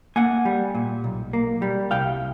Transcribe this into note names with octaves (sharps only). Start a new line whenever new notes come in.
A#3 F#5 G#5
G3
A#2
B1
A#3
G3
C2 F5 G5